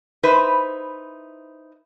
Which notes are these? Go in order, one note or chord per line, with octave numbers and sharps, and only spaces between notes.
D#4 E4 B4 C5